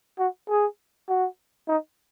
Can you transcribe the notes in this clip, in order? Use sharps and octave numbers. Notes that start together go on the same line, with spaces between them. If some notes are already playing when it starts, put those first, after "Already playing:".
F#4
G#4
F#4
D#4